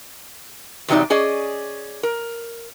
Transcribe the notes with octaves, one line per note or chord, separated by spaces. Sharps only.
E2 C3 F#3 D#4 D5
C#4 G#4 D5 D#5
A#4